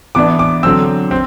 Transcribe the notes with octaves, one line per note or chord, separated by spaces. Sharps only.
E3 B3 D4 D6
D6
D3 F#3 C4 E6
C4